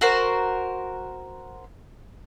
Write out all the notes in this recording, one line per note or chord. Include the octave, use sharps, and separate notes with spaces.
F#4 A#4 C5